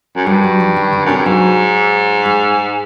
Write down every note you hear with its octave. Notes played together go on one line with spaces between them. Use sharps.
F#2
G2 G3
F#3
F3
D#3
D3
F#2 C3
G2
G#2 F#3
G#3